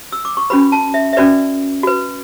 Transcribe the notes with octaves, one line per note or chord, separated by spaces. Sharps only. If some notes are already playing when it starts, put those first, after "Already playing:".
E6
D6
C#6
C#4 F#4 B4 B5
A5
E5
E5
C#4 F#4 B4 D5
F#4 B4